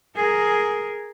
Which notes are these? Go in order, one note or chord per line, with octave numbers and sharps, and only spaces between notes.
G#4 A#4